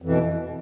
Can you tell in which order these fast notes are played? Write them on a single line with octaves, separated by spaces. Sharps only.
F2 E3 B2